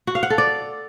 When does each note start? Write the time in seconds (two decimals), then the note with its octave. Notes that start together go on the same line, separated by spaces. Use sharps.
0.07 F#4
0.15 F5
0.23 F#5
0.30 A4
0.38 D5